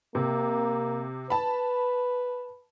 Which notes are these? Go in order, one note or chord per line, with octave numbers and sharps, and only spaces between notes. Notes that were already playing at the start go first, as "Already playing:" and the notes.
C3 A#3
B4 A5 B5